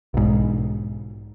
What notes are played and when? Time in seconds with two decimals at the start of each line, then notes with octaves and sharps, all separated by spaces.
0.14 B1 G#2